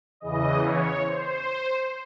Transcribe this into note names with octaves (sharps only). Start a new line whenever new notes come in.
E2 C#3 E3 D#5
C#5
C5